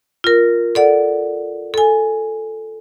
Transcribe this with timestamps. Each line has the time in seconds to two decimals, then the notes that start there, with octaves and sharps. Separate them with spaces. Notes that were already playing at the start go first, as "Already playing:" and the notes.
0.24 F4 A#4
0.75 A4 D5 F#5
1.74 A4 G#5